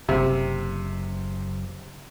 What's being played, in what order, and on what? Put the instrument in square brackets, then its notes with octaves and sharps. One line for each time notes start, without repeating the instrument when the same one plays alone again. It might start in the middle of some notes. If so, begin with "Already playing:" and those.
[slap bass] F#1 [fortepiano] C3